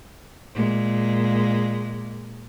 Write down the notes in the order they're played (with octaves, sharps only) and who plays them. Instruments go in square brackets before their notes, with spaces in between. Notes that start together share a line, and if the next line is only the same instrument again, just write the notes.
[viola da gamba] A#2 G#3